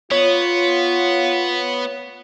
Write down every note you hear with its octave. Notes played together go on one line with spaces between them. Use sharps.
B3 F4 C#5